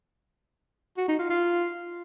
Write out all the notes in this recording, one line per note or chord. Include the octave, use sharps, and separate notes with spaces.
F#4
D#4
F4
F4